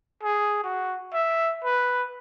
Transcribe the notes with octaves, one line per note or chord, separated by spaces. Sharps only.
G#4
F#4
E5
B4